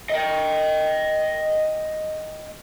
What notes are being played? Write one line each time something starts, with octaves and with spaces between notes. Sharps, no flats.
D#5 G5